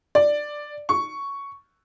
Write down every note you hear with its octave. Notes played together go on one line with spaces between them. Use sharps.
D5
C#6